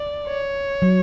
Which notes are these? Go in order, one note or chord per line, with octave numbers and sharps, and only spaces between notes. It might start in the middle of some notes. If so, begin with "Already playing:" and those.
Already playing: D5
C#5
F#3